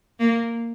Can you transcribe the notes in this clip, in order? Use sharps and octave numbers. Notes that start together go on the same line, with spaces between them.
A#3